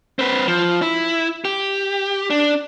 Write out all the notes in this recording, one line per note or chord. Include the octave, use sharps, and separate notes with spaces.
C4 B4
F3
E4
G4
D4